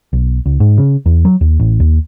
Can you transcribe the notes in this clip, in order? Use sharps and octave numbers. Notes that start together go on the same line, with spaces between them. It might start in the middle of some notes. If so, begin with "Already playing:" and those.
B1
C#2
G#2
C#3
E2
F#3
D#2
A1
D#2